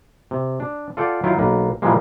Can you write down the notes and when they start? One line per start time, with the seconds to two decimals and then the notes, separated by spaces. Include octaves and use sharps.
0.31 C3
0.60 D4
0.97 F4 A4 D5 F#5 G5
1.23 D#3 F#3 E4 F4 G5
1.39 B1 A#3 B4
1.82 A#2 E3 F3 G3 G#3 A#3